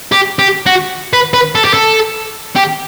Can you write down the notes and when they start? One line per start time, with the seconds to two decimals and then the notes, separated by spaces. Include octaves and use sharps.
0.12 G4
0.39 G4
0.66 F#4
1.13 B4
1.34 B4
1.55 A4
1.65 G4
1.74 A4
2.56 G4